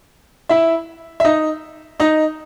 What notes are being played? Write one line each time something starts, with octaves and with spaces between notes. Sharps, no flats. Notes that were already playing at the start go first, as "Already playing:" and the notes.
E4 E5
E5
D#4 D#5
D#4 D#5